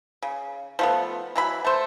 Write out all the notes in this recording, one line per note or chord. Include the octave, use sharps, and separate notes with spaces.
C#3
F3 A3 B3
E3 F#3 B5
A3 C5